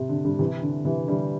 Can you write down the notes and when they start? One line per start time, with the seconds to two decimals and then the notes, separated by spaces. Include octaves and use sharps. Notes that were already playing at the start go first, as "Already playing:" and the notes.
Already playing: C3
0.09 D3
0.25 D3 G3
0.39 C3 E3
0.62 D3
0.85 C3 E3
1.08 D3 G3